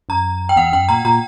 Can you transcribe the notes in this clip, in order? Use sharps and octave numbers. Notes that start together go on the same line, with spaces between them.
F#2 A#5
G5
E2 F#5
F#2 G5
A#2 A#5
A#2 A#5